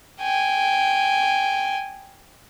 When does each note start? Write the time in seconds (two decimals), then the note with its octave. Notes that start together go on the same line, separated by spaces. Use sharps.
0.21 G5 G#5